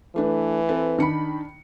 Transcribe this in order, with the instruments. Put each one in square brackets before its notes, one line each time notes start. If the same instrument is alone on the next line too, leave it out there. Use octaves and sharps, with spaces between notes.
[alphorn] E3 [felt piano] A3 D4 B4
[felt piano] C4 A4 B4
[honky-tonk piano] D#3 B5 [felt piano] D4 C#7